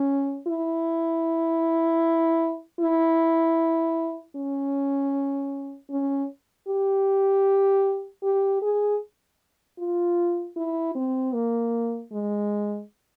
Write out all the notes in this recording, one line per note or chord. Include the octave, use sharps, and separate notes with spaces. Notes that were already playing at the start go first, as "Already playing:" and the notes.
Already playing: C#4
E4
E4
C#4
C#4
G4
G4
G#4
F4
E4
C4
A#3
G#3